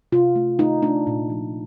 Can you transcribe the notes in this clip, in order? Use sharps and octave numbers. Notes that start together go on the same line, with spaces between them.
C3 F4
A3
A3 D#4
A3 D4
A#2
F3